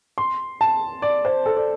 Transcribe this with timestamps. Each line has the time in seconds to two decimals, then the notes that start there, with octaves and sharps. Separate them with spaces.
0.18 C6
0.61 A5
1.02 D5
1.25 C5
1.46 A4
1.57 D5